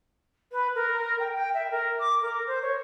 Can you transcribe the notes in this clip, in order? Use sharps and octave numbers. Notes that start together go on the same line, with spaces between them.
B4
A#4
G5
G5
E5
A#4
D6
A#4
C5
C#5